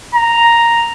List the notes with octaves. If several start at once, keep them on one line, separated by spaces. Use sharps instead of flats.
A#5